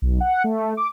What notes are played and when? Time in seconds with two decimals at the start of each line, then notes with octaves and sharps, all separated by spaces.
0.02 B1
0.20 F#5
0.44 A3
0.77 D6